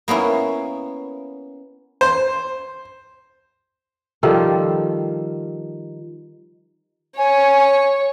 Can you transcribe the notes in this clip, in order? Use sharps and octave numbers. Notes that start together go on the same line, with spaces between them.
A#3 B3 C#4 E4
C5
D#3 F3 G3 A4
C#5 G#5